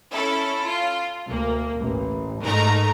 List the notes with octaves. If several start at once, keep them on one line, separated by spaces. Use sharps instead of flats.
C#4 E4 A4
F4
D2 A#3
A1
G#2 A3 D#4 A#4 A#5